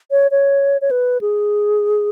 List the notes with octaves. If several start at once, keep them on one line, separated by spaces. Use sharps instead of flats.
C#5
C#5
C#5
B4
G#4